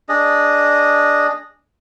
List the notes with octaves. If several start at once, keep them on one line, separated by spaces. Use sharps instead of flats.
D4 G#4 D#5